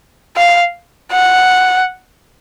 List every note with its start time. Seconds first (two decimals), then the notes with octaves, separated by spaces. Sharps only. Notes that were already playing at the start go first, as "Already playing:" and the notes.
0.37 F5
1.12 F#5